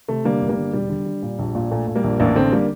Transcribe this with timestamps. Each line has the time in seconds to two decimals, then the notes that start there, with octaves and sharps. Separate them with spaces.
0.09 C3 A3
0.25 D3 G3 A#3
0.41 G1
0.49 G3 A#3
0.57 D3
0.73 E1 G3
0.89 D3
1.06 D3
1.23 A#2
1.39 A#1
1.55 A#2
1.71 A#2 A3
1.87 A#2
1.95 G3 A#3
2.04 A#1
2.20 A1 A#3 D4
2.36 D3 A3 C4
2.52 G3 A#3